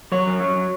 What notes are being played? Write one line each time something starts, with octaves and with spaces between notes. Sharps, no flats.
F#3 C#5
F#2
F#3